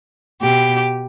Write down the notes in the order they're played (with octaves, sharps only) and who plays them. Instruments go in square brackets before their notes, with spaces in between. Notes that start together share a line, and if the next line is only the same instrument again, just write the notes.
[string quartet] B2 G4